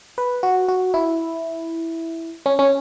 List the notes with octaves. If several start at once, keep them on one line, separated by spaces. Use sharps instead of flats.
B4
F#4
F#4
E4
C#4
C#4